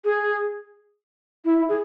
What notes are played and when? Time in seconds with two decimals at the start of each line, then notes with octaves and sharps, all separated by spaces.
0.05 G#4
1.45 E4
1.69 G#4